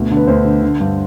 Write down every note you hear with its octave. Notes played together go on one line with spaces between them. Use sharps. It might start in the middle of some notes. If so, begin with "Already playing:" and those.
Already playing: D2 B2
D3
B4
D2 C5
D3
D3
G2